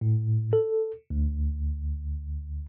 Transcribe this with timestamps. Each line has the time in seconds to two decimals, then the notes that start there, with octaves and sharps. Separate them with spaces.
0.01 A2
0.53 A4
1.10 D2